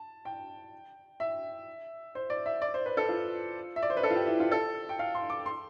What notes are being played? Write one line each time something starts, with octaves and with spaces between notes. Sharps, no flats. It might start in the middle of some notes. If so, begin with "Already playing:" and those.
Already playing: A5
G5
E5
C5
D5
E5
D5
C5
B4
A4
F4
E5
D5
C5
B4
A4
F4
G4
E4
F4
A4
G5
F5
C6
D6
C6